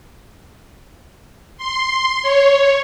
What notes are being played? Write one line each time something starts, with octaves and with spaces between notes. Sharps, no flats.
C6
C#5